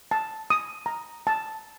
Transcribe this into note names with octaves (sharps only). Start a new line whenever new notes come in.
A5
D#6
A#5
A5